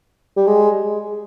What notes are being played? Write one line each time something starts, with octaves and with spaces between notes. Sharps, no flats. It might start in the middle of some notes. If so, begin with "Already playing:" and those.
G3
G#3